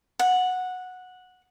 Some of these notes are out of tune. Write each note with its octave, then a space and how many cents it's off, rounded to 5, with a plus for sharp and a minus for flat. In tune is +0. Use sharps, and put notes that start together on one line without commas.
F#5 -10